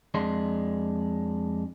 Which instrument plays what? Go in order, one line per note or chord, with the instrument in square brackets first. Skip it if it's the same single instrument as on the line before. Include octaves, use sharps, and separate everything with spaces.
[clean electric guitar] F2 G#3 D4 C6